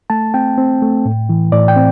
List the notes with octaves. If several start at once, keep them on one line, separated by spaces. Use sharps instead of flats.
A3 A5
C4 G5
C4
A3
A2
E3
A2 D5
G5
C4